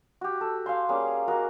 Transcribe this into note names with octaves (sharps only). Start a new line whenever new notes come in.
F#4 G4
A4
F5 G#5 C6
G3 A#3 C#4 G#4
F#4 A#4 D#5